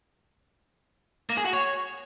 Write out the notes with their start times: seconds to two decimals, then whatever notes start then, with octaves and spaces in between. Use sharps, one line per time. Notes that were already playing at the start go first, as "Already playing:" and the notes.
1.30 A#3
1.37 G#4
1.45 F#4
1.53 C#5